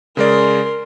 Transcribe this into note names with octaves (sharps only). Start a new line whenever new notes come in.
C#3 G#3 A#4 D5 C6